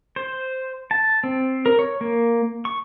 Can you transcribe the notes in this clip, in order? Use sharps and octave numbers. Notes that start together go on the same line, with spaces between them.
C5
A5
C4
A#4
C#5
A#3
C#6